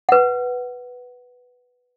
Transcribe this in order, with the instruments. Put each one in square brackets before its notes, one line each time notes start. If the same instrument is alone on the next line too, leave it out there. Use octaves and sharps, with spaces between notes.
[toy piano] B4 F#5